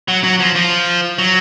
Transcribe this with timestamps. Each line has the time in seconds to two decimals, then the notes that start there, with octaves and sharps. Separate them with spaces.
0.08 F#3
0.24 F#3
0.40 F3
0.55 F3
1.19 F#3